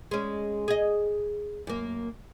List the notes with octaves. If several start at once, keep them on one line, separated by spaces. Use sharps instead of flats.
G#3 C#4
G#4 D#5
F#2 A#3